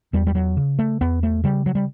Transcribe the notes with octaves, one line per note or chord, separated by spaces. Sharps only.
E2 G3
G3
F#3
C#3
A3
E2 B3
A3
C#3 G3
F#3
G3